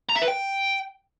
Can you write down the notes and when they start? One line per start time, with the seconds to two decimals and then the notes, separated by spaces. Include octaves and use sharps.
0.09 A#5
0.15 E5
0.22 B4
0.28 G5